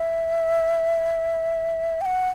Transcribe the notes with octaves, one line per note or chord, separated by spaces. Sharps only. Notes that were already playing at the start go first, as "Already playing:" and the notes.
Already playing: E5
G5
F#5